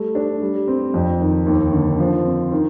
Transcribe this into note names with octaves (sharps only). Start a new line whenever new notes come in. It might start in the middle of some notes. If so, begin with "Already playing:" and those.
Already playing: G3 A3
D4
G3
C4
F2
D#3
D#2
D3
F3
C4
D#3